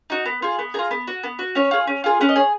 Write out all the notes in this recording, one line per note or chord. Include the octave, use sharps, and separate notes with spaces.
D#4 F#4
B3
F4 G#4
B3
F4 G#4 A#5
B3
F#4
B3
F#4
C#4 C#5
F4 G#4
C#4
F4 G#4
C#4 B4
D#5
G#4 C#5